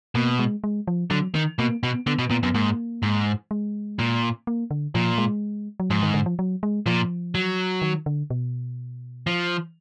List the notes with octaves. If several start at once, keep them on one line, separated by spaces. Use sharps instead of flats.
B2 A#3
G#3
G#3
F3
D3 F#3
D#3
B2 A#3
B2 B3
D3 B3
B2
A#2 B3
F#2 B3
G#2 A#3
G#2
G#3
A#2
A#3
D3
A#2 F3
G#3
F#3
G#2 F3
D#3
D3
F3
F#3
G#3
A#2 F3
F#3
D#3
D3
B2
F3